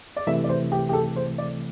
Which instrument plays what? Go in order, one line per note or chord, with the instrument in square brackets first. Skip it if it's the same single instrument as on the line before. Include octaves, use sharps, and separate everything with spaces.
[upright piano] D5
[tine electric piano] C3 E3 A3 [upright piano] E5
[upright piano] D5
C5
G4
G4
A4
C5
D5